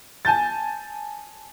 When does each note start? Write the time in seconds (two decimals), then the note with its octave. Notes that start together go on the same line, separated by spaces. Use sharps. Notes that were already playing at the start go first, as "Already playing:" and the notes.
0.25 G#5 A5 G6 A6